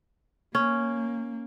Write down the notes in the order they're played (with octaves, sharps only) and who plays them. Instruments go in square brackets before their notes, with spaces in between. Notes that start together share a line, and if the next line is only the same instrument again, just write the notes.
[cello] A#3 [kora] C#4